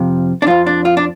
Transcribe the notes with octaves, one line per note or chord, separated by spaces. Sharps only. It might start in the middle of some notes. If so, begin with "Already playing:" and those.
Already playing: F2 C3 F3
D4
F2 F3 F4
D4
F4
D4